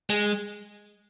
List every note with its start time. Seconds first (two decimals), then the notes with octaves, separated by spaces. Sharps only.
0.10 G#3